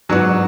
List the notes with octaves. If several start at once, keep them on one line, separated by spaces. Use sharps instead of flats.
G#2 F#3 B3 D4 F#4